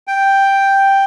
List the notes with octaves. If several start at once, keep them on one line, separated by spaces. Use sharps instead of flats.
G5